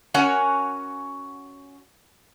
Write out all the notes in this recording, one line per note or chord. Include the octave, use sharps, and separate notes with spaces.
C#4 F#4 A#4 C#5 F#5 G#5